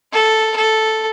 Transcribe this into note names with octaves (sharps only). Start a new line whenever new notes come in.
A4
A4